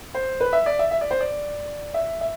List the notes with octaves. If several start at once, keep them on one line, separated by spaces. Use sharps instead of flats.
C5
B4
E5
D5
E5
E5
D5
C5
D5
E5
E5